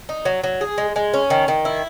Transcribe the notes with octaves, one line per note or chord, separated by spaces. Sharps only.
D#4
F#3
F#3
G#4
G#3
G#3
C#4
D#3
D#3
E4